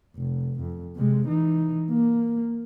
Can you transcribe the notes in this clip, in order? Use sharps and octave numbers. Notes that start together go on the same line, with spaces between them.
F1
F2
C3 G#3
E3 D#4
A#3